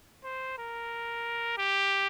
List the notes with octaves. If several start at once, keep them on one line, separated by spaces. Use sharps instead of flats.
C5
A#4
G4